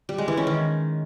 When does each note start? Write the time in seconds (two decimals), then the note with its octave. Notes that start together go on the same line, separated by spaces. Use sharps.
0.09 G3
0.18 G#3
0.28 E3
0.37 C#4
0.47 D#3